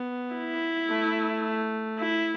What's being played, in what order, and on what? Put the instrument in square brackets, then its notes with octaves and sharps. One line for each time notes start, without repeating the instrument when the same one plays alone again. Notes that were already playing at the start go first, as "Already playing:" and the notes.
Already playing: [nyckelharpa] B3
[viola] E4
[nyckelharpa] A3
[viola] E4